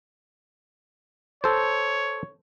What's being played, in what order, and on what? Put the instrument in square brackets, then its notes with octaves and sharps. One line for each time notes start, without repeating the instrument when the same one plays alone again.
[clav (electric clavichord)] A4 C5 [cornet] C#5